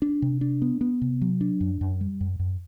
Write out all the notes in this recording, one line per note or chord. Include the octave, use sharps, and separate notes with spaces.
D4
C3
D4
B3
B3
C3
F#3
D4
F#2
F#2
G3
F#2
F#2